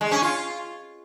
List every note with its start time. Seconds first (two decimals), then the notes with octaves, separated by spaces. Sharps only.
0.01 G#3
0.11 C#4
0.22 F4